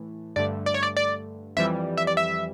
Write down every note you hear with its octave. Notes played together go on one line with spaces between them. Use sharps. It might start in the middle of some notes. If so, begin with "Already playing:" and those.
Already playing: A2 E3 A3
G2 D3 A3 D5
D5
C#5
D5
D5
F2 E3 G3 E5
E5
D5
E5